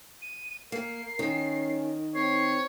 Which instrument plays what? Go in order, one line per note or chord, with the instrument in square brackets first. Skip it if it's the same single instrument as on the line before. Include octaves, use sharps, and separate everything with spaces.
[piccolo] D#7
[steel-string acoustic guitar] A#3 [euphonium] A#4 [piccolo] C7
[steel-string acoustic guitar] D#3 [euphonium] C#4
[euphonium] C4 [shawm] C#5 [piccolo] C7